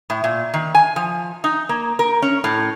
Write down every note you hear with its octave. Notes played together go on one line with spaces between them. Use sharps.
A2
A#2
D#3
G#5
F3
D#4
A#3
A#4
C#4
A2